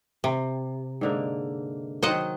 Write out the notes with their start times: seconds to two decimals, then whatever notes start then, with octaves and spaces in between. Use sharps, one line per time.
0.24 C3
1.01 G#2 D3 A#3
2.03 D#3 F#3 C5 D#5 F#5